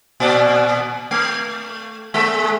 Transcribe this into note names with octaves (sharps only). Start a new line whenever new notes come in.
A#2 D5
A3
G#3 A4 E5